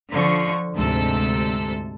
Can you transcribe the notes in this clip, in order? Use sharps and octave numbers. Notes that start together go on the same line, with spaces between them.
D3 F3 C#6
D2 G#2 C3 A4 E6